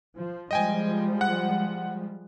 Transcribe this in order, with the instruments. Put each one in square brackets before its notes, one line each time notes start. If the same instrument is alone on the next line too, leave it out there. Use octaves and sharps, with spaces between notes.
[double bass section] F3
[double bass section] F3 G3 G#3 [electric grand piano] D#5 G5 G#5
[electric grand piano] F#5 F#6